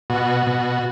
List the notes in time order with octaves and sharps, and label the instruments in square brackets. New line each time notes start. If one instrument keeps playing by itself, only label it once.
[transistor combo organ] B2 F#4
B2